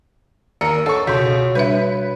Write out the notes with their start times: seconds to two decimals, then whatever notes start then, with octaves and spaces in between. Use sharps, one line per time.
0.61 D#2 A#4 E6 C#7
0.86 A4 C#5 D#5 F#5 C#6
1.07 C#2 B2 F#4 C#5 G6 B6
1.55 G3 D4 B4 E5